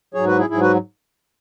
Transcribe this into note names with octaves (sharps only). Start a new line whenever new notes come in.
G#2 F#3 G#4 C#5
F#4 B4
E4 G#4
G#2 F#3 E4 G#4
F#4 B4